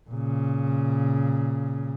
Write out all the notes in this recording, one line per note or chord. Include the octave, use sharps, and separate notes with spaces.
A#2 C#3